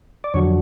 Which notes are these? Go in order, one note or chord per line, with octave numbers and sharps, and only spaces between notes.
D5
F2 D3 F#3 C#5